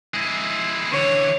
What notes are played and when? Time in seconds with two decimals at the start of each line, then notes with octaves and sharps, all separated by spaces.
0.14 G#3 E4
0.92 D3 E3 C#5